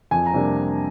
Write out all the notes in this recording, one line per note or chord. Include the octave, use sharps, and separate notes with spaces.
F2 G#5
A#5
C3 G3 A#3 D4